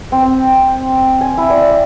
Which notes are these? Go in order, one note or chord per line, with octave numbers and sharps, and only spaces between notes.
C4
G#5
E4
D5